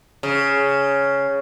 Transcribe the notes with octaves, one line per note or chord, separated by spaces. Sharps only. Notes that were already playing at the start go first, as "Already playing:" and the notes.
C#3